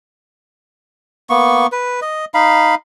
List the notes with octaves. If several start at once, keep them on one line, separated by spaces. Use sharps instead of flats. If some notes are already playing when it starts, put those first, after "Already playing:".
A#3 B3 C#6
B4
D#5
D#4 F5 B5